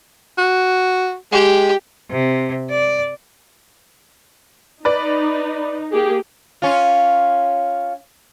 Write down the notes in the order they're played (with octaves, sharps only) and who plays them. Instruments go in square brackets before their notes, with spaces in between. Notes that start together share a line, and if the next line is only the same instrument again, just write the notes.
[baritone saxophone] F#4
[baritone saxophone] G#3 [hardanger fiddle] G4
[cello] C3
D5
[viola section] D#4 [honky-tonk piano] B4 D5
[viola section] A#3 G4 G#4
[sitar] C#4 F4